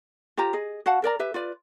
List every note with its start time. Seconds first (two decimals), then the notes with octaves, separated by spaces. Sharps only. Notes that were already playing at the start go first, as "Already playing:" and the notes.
0.37 F4 G4 C5 A#5
0.53 G#4 D#5
0.86 F#4 F5 F#5 A5
1.02 A4 A#4 D5 A#5
1.19 G4 B4 E5
1.34 F4 B4 D5